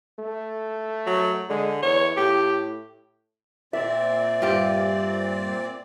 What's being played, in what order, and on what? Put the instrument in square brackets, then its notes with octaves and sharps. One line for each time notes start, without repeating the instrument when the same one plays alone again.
[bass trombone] A3
[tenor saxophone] F#3
[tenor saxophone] D3 [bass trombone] G#3
[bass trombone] E2 [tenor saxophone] C#5
[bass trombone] A2 [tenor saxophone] G4
[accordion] A#2 C4 D5 [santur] E5
[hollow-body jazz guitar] G2 F4 G4